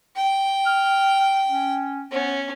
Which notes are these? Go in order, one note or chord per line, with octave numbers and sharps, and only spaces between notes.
G5
F6
C#4
B3 C#4